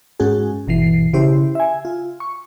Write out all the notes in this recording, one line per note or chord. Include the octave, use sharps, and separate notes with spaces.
G#2 G#3 C#4 F#4 G#4
G1 B2 E3 C7
C#3 E4 G4 C5
E5 G#5
F4
C#6